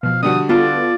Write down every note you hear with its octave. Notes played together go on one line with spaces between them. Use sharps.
B2 F3 F5
D3 G3 F#4 D#6
B3 F4 A4 D5